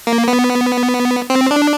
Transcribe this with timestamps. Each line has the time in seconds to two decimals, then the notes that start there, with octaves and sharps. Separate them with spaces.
0.07 A#3
0.27 B3
1.30 C4
1.51 D4